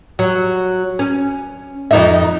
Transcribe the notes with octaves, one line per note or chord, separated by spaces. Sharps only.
F#3
C#4
F2 D#4 E5